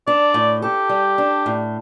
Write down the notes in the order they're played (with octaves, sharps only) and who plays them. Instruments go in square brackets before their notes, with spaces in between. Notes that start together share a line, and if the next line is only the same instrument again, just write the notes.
[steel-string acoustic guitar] D4 [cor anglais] D5
[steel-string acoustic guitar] A2
[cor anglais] G4 [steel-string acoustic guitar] A4
[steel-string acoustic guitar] G3
D4
A2